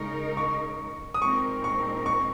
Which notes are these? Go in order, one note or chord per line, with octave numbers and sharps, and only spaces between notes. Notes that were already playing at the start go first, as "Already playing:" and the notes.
Already playing: C#3 G#3 D#4 A#4 C#6
C#6
D#6
A#2 G#3 C4 D#4 A#4 C#6
C#6
C#6